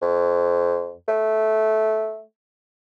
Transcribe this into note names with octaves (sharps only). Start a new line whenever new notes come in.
F2
A3